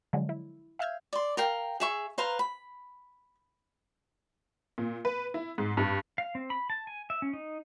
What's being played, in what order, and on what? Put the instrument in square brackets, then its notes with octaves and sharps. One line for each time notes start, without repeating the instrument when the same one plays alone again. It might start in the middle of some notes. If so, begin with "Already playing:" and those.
[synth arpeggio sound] D3 F3 F#3 G#3
E4
E5 F5 E6 F6 G6 G#6
[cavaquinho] D5 C6
A#4 F5 G5
G#4 E5 C#6
B4 C5 F5 A#5
B5
[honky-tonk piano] A#2
B4
E4
G#2
G2
[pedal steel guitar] F5
C4
B5
A5
G#5
E5
C#4
D#4